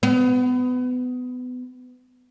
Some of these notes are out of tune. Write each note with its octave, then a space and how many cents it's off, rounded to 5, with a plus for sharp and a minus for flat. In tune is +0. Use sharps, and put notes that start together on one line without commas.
B3 +25